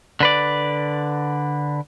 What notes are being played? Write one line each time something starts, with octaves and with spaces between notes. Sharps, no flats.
D3 B4 D5